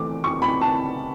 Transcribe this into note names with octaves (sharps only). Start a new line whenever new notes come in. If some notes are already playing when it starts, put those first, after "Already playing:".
Already playing: E3 A3 D6
C#6
B5
A5